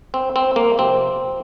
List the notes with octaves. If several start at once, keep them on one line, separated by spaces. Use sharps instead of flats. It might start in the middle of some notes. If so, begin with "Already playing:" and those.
C4
C4
A#3
C3 F3 C4